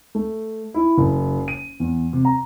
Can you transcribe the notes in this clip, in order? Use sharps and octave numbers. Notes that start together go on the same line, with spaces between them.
A3
E4
F#1
D#7
E2
C3
A#5